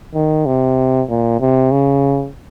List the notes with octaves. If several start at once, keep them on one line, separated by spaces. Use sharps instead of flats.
D#3
C3
A#2
C3
C#3